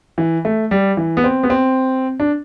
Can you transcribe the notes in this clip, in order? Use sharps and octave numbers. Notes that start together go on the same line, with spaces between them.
E3
A3
G3
E3
B3
C4
B3
C4
D4